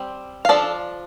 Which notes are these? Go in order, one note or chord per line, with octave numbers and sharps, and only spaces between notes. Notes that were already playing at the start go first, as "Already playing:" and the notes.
Already playing: G3 C4
F5
F3 D4 A4 D5